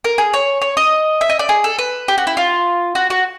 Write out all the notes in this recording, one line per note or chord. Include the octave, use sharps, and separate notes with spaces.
A#4
G#4
C#5
C#5
D#5
E5
D#5
D5
G#4
A4
B4
G4
F#4
E4
F4
F#4
F#4